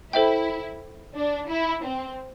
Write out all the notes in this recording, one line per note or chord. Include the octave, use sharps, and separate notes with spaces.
E4 A4 C5 E5 G5
D4
E4
C4